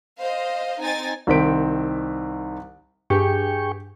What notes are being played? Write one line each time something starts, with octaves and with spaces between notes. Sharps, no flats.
C5 D#5 F5
C4 D#4 G#5 A6
C2 D#3 C4 B6 D7
G2 G4 G#4 G5 C#6